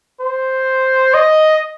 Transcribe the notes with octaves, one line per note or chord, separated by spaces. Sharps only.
C5
D#5